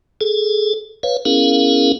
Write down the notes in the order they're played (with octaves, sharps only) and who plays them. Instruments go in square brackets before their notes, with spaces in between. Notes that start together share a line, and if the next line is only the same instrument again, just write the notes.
[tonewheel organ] G#4 A4
B4 C#5 F5
B3 C#4 E4 G#4 A#4 F5